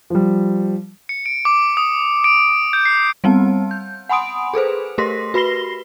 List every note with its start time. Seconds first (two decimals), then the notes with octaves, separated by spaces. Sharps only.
0.10 F3 G3
1.09 C#7
1.26 D7
1.45 D6
1.77 D#6
2.24 D7
2.73 G6
2.85 C7
3.24 G3 B3 C4 A5
3.71 G6
4.09 F#5 G#5 B5 C6 D#6 D7
4.54 G#4 A4 B4 C5
4.98 A3 G4 A#4 C6 A#6 B6
5.34 F#4 B4 B5 A#6 C7 G7